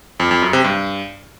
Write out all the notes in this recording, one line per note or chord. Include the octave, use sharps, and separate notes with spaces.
F2
F2
F#2
C3
G2